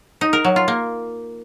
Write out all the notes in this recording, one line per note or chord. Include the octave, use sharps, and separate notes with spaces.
D#4
A#4
F#3
F4
A#3